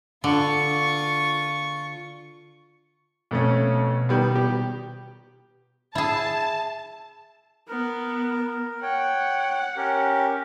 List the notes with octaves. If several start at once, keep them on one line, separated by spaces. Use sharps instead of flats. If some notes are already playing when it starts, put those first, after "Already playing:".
D3 F4 C#6
F2 B2 A3 C#4
D#3 G3 B3
G4
E4 G#4 A5
B3 A#4
C#5 F#5 G5
C#4 G4 A#4